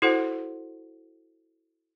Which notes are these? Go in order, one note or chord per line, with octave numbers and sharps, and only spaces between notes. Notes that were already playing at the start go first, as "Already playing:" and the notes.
E4 F#4 A4 C5 F#5